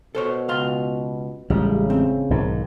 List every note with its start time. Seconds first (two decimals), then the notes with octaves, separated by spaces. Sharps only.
0.15 B2 A4 C5 C#5
0.49 C#2 F5 C6
1.50 A1 C#3 G3 G#3
1.90 C4
2.30 B1 G#2 D#3